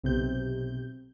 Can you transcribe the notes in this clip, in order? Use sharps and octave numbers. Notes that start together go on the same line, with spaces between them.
B1 C3 G6